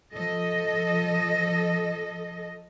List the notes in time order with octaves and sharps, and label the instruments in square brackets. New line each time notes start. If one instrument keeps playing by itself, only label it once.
[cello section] F3 A4 D#5